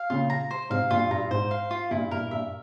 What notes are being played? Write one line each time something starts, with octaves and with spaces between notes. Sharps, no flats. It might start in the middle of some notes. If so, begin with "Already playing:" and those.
Already playing: F5
A#2 C#3 F4
A#5
C5
G#2 C3 F5
G2 A#2 F4
G2 A#5
G#2 C5
F5
F4
G2 A#2 E4
G2 A#2 A#4
G2 A#2 E5